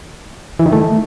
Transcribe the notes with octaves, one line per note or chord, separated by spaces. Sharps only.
E3
D#3
A3